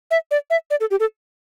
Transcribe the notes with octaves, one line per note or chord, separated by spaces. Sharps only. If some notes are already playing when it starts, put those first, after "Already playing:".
E5
D5
E5
D5
A4
G4
A4